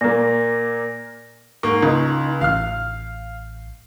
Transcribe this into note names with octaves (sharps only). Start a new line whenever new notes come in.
A#2 A#3 A#6
G#2 A#3 C#6
C#2 D#4
A1 F5 F6